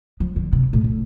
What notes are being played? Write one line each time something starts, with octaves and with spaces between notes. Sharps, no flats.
F3
D3
C3
A2
A2